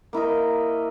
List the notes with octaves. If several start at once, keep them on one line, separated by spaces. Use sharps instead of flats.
A#3 E4 A#4 D#5